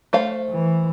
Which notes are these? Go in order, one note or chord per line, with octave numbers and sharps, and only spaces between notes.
A3 C5 F5
E3